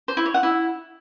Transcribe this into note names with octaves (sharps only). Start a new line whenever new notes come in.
C5
E4
C#5
F#5
E4